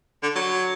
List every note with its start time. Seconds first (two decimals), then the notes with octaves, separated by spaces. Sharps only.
0.23 D3
0.36 F#3